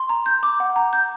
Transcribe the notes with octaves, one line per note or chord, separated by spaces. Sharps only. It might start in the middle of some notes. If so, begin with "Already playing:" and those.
Already playing: C6
A#5
G6
D6
F#5
A#5
G6